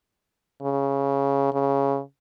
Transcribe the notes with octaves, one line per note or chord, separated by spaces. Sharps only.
C#3
C#3